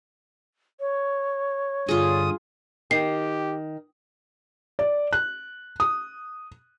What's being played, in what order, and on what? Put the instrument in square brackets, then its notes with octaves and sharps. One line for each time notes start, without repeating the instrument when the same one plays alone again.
[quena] C#5
[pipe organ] G2 D3 D#6 [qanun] F4 G#4
[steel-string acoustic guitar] D#3 [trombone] G4 [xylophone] C7
[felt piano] D5
F#6
D#6